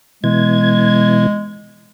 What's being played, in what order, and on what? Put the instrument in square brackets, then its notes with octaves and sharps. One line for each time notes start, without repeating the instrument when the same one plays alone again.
[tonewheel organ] B2 E3 G#6 [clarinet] G#3